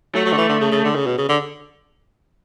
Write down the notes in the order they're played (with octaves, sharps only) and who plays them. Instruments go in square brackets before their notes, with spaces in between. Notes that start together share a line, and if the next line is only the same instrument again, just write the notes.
[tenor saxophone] F#3 [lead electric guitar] A3
[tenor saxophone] F#3
D3
E3
D3
C#3
C#3
D3
C#3
B2
C#3
D3